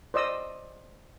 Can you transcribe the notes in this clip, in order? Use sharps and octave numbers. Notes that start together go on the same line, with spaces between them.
C5 D5 D#5 E6